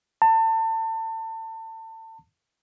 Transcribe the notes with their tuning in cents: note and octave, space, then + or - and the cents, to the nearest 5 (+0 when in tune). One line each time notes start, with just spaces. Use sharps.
A5 +30